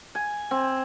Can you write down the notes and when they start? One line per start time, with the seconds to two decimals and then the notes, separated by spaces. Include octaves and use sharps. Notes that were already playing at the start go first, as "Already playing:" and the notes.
0.15 G#5
0.51 C4